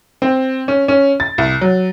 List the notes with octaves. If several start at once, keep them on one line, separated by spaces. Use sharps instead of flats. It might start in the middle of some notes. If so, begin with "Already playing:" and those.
C4
C#4
C#4
A6
C2
F#3